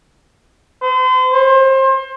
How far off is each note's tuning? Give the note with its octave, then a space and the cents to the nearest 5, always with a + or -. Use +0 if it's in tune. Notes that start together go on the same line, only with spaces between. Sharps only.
C5 -40
C5 +30